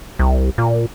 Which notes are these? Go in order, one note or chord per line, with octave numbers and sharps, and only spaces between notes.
C2
A#2